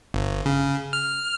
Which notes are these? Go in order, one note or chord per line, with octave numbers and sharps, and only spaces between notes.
G1
C#3
F6